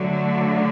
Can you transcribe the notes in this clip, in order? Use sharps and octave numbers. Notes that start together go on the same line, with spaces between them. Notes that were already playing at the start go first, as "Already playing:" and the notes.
Already playing: D3 F#3 A3